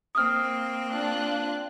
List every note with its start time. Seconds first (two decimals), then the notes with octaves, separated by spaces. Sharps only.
0.15 A#3 C4 D#6 F6
0.91 D4 F4 F#6